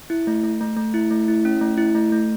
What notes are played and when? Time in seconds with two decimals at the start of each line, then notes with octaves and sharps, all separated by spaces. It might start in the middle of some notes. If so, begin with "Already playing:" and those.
0.10 E4
0.27 A3
0.43 A3
0.61 A3
0.77 A3
0.94 E4
1.11 A3
1.28 E4
1.45 C#4
1.61 A3
1.78 E4
1.95 A3
2.12 A3